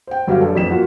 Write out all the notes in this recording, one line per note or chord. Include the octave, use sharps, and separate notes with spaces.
C5 G5
G1 F#3 G4 F5
F#2 D4 G4 A4
A1 F2 B6 E7
A#3 F4 F#4